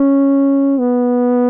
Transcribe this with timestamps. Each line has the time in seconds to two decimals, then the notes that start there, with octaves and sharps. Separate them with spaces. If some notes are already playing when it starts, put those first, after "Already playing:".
Already playing: C#4
0.80 B3